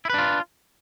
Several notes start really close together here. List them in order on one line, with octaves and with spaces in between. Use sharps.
E4 B4 D4 F4